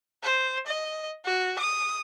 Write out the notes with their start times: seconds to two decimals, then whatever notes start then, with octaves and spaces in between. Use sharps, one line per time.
0.23 C5
0.67 D#5
1.25 F#4
1.59 D#6